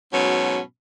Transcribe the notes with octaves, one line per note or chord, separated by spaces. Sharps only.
G#2 B2 F#3 C#4